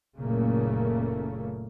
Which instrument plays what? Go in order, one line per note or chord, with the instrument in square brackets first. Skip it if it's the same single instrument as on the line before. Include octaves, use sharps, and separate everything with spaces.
[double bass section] F#1 A#2 C#3 A3 A#3